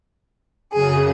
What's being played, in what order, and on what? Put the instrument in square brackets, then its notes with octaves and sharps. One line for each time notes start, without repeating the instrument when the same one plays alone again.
[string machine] F#2 C#3 [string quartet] G#4